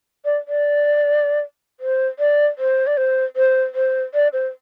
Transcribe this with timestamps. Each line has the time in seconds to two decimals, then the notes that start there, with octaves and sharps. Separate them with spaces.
0.25 D5
0.48 D5
1.80 C5
2.19 D5
2.58 C5
2.87 D5
2.97 C5
3.36 C5
3.75 C5
4.14 D5
4.33 C5